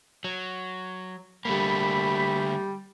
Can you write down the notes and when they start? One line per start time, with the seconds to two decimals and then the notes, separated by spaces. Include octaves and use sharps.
0.24 F#3
1.45 D3 G3 A3 A#3 B5